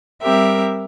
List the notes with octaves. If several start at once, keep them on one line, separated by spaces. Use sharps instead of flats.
G3 C4 G4 A#4 E5